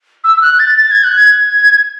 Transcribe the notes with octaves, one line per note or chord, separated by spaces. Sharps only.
E6
E6
F#6
A6
A6
G#6
F#6
G#6